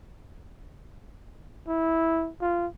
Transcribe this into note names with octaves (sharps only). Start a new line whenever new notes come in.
E4
F4